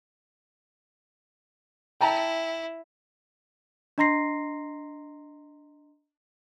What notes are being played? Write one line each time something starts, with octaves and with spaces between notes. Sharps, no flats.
E4 G5 A5 A#5
D4 D#5 A#5 C6 A#6 C7